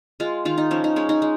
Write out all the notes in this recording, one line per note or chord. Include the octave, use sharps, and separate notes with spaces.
G#3 F4
D#3 F4
D#4
F3 C#4
D#4
G#3 C#4
D#4
G#3